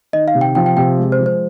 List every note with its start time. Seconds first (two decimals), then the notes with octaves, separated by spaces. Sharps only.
0.13 D#3 D#5
0.28 F5
0.35 C3
0.41 G5
0.55 F3 G5
0.66 G5
0.77 C3 G5
0.98 G#3
1.12 C5
1.19 F3
1.26 C5